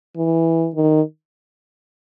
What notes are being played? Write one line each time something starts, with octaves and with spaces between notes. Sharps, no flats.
E3
D#3